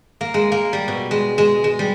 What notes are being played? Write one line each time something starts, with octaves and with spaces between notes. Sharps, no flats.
A#3
G#3
A#3
G3
B2
G#3
G#3
G#3
G3